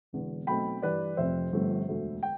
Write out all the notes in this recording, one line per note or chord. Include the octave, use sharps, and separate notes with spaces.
E1 E2 D3
B1 B2 A3 C4 G5 B5
G2 E3 G3 B4 D5
F1 F2 C3 F3 C4 C5 E5
G1 G2 F3 A3 C4
E1 D2 D3 A3
G5